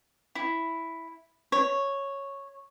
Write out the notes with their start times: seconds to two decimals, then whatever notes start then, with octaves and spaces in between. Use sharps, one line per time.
0.35 E4
1.52 C#5